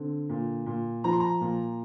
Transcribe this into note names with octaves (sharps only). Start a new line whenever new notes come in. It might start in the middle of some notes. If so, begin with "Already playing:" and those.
Already playing: D3 C4
A#2
A#2
F3 A#5
C6
A#5
A#2